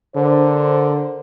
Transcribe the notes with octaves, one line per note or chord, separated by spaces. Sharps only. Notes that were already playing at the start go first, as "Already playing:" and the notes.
D3 D4 A#4 C5